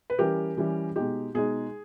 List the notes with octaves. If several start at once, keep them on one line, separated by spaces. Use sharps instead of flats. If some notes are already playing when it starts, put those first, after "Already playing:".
B4
E3 G3 C#4 G4 A#4
E3 G3 C#4
B2 G#3 D#4 G4
B2 G#3 D#4 G#4